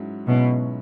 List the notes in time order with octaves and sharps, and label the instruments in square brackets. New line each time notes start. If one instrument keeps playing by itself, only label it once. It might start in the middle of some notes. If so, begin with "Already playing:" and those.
Already playing: [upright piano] G#2 F#3 C#4 E4
[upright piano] G#2 F#3 C#4 E4 [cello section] B2